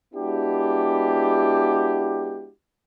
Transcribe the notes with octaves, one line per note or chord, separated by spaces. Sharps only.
G#3 B3 D4 E4 F#4 G4